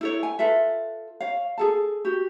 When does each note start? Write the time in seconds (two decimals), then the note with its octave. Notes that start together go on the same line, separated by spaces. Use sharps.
0.01 E4 A4 C#5
0.23 G#5
0.39 F4 A4 B4 E5
1.20 C#5 F5
1.58 G#4 A4 A5
2.05 F#4 G4